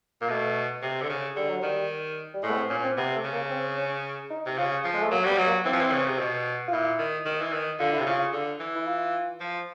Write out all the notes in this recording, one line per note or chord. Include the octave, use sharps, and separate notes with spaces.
A#2 A#3
B2 A3
C3
D3
C#3
D3 G3
F#3
D#3 G3
G3
A2 G#3
B3
C4
A#2 C#4
C4
C3 B3
A3
C#3
A#3
C4
C#4
D#4
C3
C#3 F4
F3
G#3
A3
F#3 A#3
G3 B3
F#3
A#3
E3 C4
F3
E3
C#3
C3
B2
F4
A#2 E4
D#3
D#3
E3
D#3
D3 F4
E4
C3
C#3 F4
D3
E3
E4
F4
F3